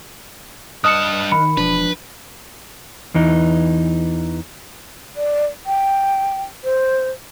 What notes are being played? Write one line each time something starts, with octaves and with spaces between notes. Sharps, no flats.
G2 D#5 A5 D#6 F6 F#6 C#7
D#3 B5 C#7
E1 F3 D4 B4
E2 E3 D#4
D5
G5
C5